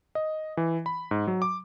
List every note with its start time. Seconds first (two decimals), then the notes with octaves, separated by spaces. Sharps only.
0.15 D#5
0.57 E3
0.86 B5
1.11 G#2
1.27 F#3
1.42 D6